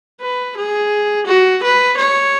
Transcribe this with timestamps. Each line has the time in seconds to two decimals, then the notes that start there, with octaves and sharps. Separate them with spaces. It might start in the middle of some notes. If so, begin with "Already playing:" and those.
0.21 B4
0.57 G#4
1.27 F#4
1.63 B4
1.98 C#5